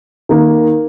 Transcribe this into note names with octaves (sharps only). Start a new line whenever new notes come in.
D#3 A#3